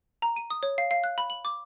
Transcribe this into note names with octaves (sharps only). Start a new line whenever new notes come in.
A#5
D#7
D#6
C#5
F5
F5
F#6
B5
F#7
D6